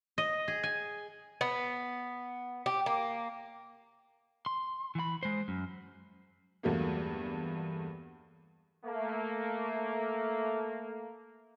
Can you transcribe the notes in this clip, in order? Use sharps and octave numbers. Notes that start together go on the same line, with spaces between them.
D#5
G#4
G#5
B3
G4
A#3
C6
E3 B5
G#3 C5
F#2
E2 G2 F#3 A3 A#3
A3 A#3